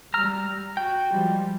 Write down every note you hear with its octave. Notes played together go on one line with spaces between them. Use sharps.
G3 A#5 E6 F6
F#4 G5
F3 G3 G#3